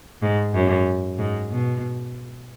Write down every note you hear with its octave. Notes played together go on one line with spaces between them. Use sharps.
G#2
F#2
G#2
B2